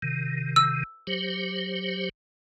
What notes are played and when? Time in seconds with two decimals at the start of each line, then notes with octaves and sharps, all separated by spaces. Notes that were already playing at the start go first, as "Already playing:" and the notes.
0.02 C3 D#3
0.56 E6
1.07 F#3 G4 C5